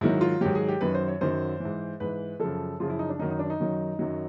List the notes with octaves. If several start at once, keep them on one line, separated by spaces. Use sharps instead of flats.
G#2 D#3 F#3 E4
F4
G#2 D#3 F#3 G4
G#4
G4
F#2 D#3 F#3 B4
C5
C#5
F#2 D#3 F#3 C5
G#2 E3
G#2 E3 B4
F#2 C#3 F3 A4
F#2 C#3 F3 F4
E4
D#4
D4
F#2 D#3 F#3 D#4
D#4
D4
D#4
F#2 D#3 F#3
F#2 D#3 F#3